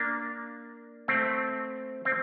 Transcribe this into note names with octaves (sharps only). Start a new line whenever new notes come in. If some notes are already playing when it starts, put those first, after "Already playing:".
Already playing: A#3 D4
A3 C4
C4